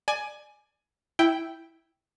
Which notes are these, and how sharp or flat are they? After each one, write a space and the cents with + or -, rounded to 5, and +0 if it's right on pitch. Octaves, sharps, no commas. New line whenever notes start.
D5 +25 G#5 +15
E4 +0 G5 +0